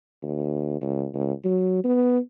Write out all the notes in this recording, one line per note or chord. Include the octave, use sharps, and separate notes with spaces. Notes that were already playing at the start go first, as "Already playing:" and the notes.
D2
C#2
C#2
F#3
B3